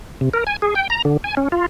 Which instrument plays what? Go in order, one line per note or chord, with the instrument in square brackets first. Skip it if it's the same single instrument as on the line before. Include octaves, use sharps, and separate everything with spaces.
[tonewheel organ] C3
A#4
G#5
G#4
G5
A#5
D3
G#5
C#4
F4